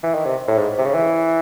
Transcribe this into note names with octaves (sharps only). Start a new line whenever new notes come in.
E3
D#3
C3
A2
G#2
C3
C#3
E3